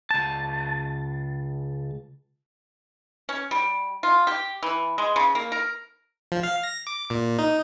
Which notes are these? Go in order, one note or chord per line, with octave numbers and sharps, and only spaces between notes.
C#2 A5
C#4
G3
F4
G4
E3
G#3
C#3
A#3
A#4
F3
F5
A#6
D6
A#2
D#4